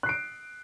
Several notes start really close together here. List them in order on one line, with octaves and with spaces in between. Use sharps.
F#6 C7 D7